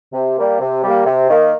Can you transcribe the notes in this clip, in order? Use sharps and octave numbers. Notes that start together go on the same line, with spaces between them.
C3
G3 A#3
C3
G3 A#3
C3
D#3 A#3